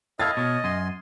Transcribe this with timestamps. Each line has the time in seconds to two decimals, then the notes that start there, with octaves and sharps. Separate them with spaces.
0.20 E4 A4 D#5 F5 F6 G#6 A6
0.37 B2 C#5
0.64 F#2 G#5 C6